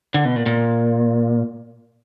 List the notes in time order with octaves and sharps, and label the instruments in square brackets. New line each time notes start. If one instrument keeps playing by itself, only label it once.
[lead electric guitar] D3
B2
A#2
A#2